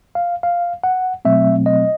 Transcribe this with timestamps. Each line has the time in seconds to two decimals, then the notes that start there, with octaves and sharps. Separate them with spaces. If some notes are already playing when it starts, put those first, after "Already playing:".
0.15 F5
0.43 F5
0.84 F#5
1.25 B2 F#3 A3 C4 E5
1.66 D#5